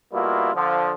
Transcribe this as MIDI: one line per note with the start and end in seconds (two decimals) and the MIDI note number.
0.12 0.51 47
0.12 0.51 55
0.12 0.51 58
0.12 0.51 64
0.12 0.51 65
0.54 0.92 50
0.54 0.92 53